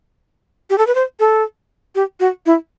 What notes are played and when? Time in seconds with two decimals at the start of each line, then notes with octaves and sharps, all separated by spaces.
0.70 G4
0.78 A4
0.87 B4
0.95 C5
1.20 A4
1.95 G4
2.20 F#4
2.46 E4